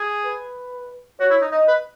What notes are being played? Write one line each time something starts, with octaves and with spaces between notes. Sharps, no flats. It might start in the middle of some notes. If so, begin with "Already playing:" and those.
Already playing: G#4
B4
F#4 C#5
E4
D#4
D#4 D#5
B4